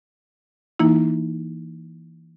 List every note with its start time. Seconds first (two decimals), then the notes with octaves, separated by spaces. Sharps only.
0.79 E3 A#3 D#4 E4